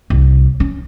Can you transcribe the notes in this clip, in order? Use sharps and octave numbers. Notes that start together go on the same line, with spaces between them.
C2
C#4